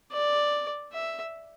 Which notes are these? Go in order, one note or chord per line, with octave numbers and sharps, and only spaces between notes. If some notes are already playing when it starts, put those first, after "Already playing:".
D5
E5